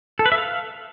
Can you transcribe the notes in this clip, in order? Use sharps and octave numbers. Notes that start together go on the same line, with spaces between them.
A4
B4
E5
F5